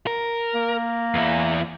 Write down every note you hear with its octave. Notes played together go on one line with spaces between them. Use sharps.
A#4
A#3
E2 E4